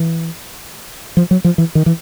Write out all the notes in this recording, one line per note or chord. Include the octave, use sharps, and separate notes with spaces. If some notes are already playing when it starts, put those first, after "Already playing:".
Already playing: E3
F3
F#3
F3
E3
D#3
E3